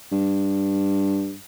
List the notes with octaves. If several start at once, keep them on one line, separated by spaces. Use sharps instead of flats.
G2